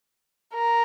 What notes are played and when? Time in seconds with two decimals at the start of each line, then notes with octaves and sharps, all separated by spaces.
0.54 A#4